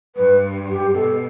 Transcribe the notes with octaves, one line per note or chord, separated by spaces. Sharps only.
G2 B4
G4
B2 A4